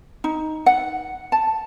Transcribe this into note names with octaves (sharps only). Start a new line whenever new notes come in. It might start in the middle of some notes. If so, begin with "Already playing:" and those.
D#4
F#5
A5